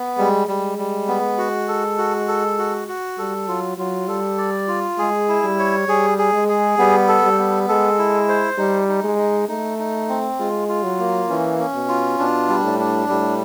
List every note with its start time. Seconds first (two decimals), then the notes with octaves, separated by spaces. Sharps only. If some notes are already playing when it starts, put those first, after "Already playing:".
Already playing: B3
0.17 G3 G#3
0.48 G3 G#3
0.78 G3
1.08 B3
1.38 F#4
1.68 A4
1.98 F#4
2.28 A4
2.58 F#4
2.88 F#4
3.18 G3 A4
3.48 F#3 F4
3.78 F#3 F4
4.08 G3 A4
4.38 D5
4.68 F4
4.98 G#3 G#4
5.28 E4
5.44 G3
5.59 C#5
5.88 G3 G#4
6.18 G#4
6.33 G#3
6.48 G#4
6.78 G3 B3
7.08 A4
7.23 G3
7.39 B3
7.68 G#3 A4
7.99 E4
8.29 C5
8.58 G3 D#4
8.89 D#4
9.03 G#3
9.18 D#4
9.48 A3 D#4
9.79 D#4
10.09 C4
10.39 G#3 F4
10.68 F4
10.83 F#3
10.99 A#3
11.29 E3 C#4
11.59 C#4
11.74 B2
11.89 F4
12.19 B2 D4
12.49 G3
12.63 A2
12.79 D4
13.09 A2 G3